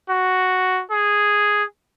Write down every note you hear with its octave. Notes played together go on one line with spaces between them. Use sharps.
F#4
G#4